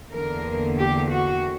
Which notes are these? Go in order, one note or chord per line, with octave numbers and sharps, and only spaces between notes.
E2 D3 A#3 A#4
G4
F#4